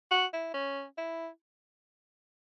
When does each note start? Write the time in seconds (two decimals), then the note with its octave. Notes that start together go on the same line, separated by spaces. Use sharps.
0.11 F#4
0.33 E4
0.54 C#4
0.98 E4